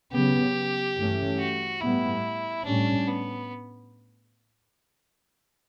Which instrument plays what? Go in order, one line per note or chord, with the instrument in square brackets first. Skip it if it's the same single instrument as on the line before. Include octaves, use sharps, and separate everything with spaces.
[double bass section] C#3 F#3 B3 [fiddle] G4
[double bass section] G2 E3 A3 C#4
[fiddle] F#4
[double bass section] A2 G3 B3 [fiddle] E4
[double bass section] A2 G3 C#4 [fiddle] D4
[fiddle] B3